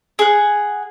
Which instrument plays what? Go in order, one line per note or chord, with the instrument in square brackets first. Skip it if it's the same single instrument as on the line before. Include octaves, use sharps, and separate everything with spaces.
[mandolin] G#4 F#5